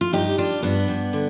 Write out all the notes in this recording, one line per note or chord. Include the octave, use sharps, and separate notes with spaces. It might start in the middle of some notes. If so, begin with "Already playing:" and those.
F4
G2 D#4 G4
G2 D4 F4
G2 B3 D4
G2
D3